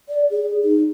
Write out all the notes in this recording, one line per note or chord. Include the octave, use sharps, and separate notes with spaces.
D5
G#4
D#4